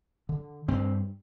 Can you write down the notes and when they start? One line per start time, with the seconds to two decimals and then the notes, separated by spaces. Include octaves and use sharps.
0.29 D3
0.68 G2 C4